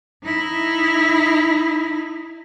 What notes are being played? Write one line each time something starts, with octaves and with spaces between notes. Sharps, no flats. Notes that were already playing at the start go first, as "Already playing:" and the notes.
D#4 E4